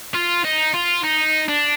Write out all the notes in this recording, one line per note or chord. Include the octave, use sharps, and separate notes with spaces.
F4
D#4
F4
D#4
D4